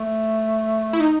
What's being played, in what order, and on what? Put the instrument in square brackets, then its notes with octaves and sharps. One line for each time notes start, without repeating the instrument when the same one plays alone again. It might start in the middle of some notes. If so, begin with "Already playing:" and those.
Already playing: [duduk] A3
[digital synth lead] E4
D#4